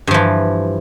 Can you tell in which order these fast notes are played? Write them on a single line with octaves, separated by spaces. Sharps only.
G2 F3 E3